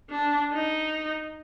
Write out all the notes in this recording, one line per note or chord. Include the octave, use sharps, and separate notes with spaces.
D4
D#4